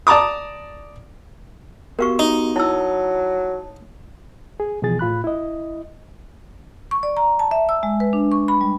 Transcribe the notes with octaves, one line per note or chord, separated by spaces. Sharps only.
D5 A5 A#5 D6 D#6
B3 F#4 G4 A#4 F5 C#6
D#4
F#3 E4 A5 E6
G#4
B2 E3 F3 G#4 A6
A2 F4 B5 F#6
E4 D#5
C#6
D5
A#5
A5
E5
E6
G#3
B4
D4
C#6
B5
G3